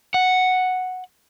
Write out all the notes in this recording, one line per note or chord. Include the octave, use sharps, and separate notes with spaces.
F#5